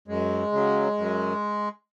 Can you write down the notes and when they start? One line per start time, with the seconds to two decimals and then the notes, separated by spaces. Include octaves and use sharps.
0.08 F#2 G#3
0.52 C#3 F#3
0.98 F#2